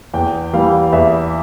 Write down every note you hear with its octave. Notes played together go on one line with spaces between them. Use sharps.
E2 G5
E3 G3 F5
E2 E5